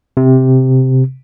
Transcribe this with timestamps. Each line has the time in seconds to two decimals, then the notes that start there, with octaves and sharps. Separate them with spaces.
0.17 C3